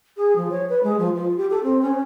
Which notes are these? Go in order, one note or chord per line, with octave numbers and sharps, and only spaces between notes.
G#4
F3
C#5
B4
G#3
F3
F4
G4
A4
C4
C#4